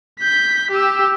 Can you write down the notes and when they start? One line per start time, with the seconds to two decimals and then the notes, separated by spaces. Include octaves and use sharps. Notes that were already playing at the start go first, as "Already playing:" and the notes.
0.20 G6 B6
0.71 G4 E6